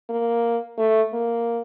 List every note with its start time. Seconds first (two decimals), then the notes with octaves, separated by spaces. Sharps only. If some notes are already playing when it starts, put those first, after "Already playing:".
0.09 A#3
0.78 A3
1.13 A#3